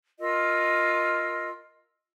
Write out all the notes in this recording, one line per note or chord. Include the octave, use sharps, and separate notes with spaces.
F4 A#4 D#5 E6